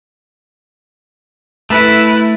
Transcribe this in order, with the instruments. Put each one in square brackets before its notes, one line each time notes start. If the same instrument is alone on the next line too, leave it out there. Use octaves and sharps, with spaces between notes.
[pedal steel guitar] A3 [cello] E4 B4